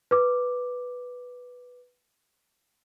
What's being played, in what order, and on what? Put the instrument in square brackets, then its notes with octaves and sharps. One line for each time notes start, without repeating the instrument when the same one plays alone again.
[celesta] B4 D6